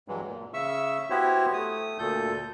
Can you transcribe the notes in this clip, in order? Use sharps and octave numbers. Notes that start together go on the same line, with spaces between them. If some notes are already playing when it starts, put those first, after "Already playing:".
G2 E3 F#3 G#3
A#2
C#3 E5 C#6 E6
B3 E4 F#4 G4 C5 C#5
A3 D#6
D2 A#2 A4 G6